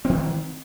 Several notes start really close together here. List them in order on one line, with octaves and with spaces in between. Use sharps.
C4 D#3 E3